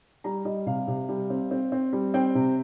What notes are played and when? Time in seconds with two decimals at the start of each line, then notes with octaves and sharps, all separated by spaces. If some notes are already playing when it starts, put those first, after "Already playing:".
0.24 G3 A#5
0.45 G3 D#5
0.66 C3 F5
0.88 C3
1.09 G3
1.30 C4
1.51 C4
1.72 C4
1.93 G3
2.14 C4 G5
2.35 C3